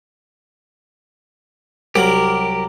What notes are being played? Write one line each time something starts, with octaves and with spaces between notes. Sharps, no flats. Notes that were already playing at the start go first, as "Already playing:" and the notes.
C2 F#3 G4 A#4